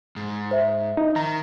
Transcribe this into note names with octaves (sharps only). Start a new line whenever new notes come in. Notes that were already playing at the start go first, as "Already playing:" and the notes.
G#2
C5 E5
D#4
D#3 A#5